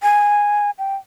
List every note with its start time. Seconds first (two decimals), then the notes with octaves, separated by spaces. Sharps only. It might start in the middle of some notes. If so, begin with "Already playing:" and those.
0.03 G#5
0.79 G5